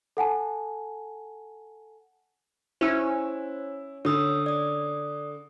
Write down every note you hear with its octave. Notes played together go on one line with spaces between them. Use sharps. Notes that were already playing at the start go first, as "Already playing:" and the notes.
A4 F#5 G#5 A5
C#4 E4 C5 E6
D3 C#5 D#6 E6
D5 D#6